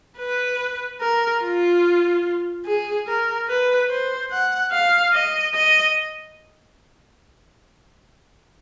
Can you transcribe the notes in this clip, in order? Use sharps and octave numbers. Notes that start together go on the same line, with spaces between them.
B4
A#4
F4
G#4
A#4
B4
C5
F#5
F5
D#5
D#5